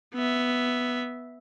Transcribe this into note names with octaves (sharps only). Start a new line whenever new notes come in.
B3 E5